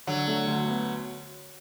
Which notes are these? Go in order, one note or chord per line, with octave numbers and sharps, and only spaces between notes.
D3 F#3
A3
D2
B3